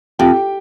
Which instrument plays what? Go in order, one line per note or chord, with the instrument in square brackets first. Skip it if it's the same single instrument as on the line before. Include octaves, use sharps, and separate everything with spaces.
[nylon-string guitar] F2 [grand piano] G4 G5